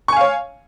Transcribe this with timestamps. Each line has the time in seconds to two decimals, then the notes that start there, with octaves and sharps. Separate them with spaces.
0.08 C#6
0.13 G#5
0.17 F5
0.21 C#5